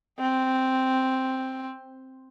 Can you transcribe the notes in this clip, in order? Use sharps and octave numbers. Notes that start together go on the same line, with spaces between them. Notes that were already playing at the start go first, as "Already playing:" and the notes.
C4